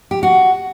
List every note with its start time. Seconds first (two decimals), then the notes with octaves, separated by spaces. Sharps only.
0.11 G4
0.23 F#4